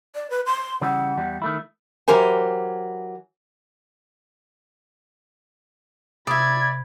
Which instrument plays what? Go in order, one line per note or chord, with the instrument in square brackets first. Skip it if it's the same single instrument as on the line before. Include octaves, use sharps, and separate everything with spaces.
[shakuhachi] D5
B4
C6
[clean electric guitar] C#3 E3 G3 [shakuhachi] F#5
[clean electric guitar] E2 G3
D#3 A3 E4
[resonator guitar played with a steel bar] E3 F#3 G4 A#4 C5 G#5
[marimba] C3 D#6 [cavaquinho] D5 E5 [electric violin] B5 G#6